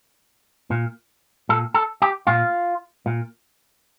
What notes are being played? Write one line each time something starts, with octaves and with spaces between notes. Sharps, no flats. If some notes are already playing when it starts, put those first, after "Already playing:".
A#2
A#2 A4
A4
G4
A#2 F4
A#2